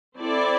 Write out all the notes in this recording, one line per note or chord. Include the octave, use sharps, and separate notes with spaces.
C4 E4 A4 D5